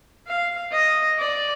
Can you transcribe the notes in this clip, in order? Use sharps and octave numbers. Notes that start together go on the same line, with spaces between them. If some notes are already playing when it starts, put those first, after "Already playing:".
F5
D#5
D5